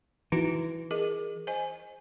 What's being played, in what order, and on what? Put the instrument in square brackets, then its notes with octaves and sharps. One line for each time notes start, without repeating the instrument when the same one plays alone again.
[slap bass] E3 [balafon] D#4 E4 F#4
[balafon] G#4 A#4 D#5
C5 D#5 G#5